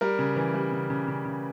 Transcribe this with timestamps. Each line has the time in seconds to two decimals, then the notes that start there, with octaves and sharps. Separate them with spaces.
0.01 G3 A#4
0.19 C#3
0.36 E3
0.54 G3
0.72 C#3
0.90 C#3
1.08 C#3
1.25 C#3